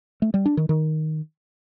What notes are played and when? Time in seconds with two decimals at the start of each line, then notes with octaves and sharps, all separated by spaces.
0.22 A3
0.34 G3
0.46 D4
0.57 D#3
0.69 D#3